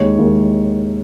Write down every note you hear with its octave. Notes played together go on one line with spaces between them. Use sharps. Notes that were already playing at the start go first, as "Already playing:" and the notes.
Already playing: D#2 D#3 G#3 C#5
D#2 D#3 G#3